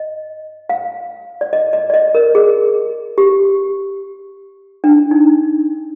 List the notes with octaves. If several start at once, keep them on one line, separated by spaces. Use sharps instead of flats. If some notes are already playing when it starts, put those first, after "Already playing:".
Already playing: D#5
F5
D5
D#5
D#5
D5
D#5
A#4
G#4
G4
D4
D#4